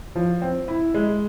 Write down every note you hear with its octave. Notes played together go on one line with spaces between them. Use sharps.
F3
C4
E4
G#3